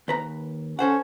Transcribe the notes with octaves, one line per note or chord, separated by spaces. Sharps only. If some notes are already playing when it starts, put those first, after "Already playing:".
D#2 B4 A#5
C#4 A4 C5 F#5